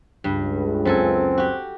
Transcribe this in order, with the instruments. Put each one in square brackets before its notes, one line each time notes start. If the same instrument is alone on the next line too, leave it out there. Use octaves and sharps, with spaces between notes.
[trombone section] C#2 [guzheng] G2
[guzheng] F#2 A4 G#5 [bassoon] C4
[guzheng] F#4 G4